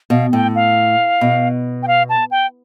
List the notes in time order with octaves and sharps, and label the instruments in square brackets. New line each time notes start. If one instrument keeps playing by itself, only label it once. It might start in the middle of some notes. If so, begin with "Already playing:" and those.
[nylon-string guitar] B2 [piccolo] F5
[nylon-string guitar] A2 [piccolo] G5
[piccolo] F5
[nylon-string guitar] B2
[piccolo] G5
F5
A5
G5